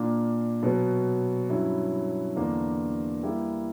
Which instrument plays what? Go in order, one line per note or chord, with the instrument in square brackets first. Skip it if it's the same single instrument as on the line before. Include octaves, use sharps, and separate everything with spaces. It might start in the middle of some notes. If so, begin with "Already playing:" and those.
Already playing: [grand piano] A#2 A#3 D4
B2 F#3 B3
G2 F#3 C#4 E4
E2 D3 A#3 D4 A#4
G3 A#3 E4